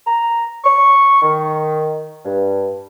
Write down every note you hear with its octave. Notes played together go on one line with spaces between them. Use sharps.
A#5
C#6
D#3
G2